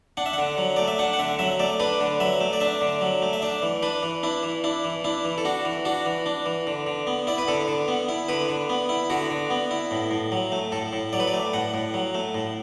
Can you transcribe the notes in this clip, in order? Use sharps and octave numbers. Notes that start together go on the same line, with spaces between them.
D4 F#5
E5
D3 F#5
F#3
A3 D5
E5
D4 F#5
F#5
D3 E5
F#3 E5
A3 D5
D4 B4
D3
F#3 E5
A3
D5
D4 E5
D3
F#3
A3
E5
D4 D5
E3
D4 B4
E3
D4 E4
E3
D4 E4
E3
D4 E4
E3
A4
D4 F#4
E3
D4 F#4
E3
D4
E3
D3
D3
B3
E4 D5
B4
D3 A4
D3
B3
E4
D3 B4
D3
B3
E4
D3 F#4
D3
B3
E4
A2
A2
F#3
A3
A2 A4
A2
F#3 D5
B4
D5
A3
A2 F#5
A2
F#3
A3
A2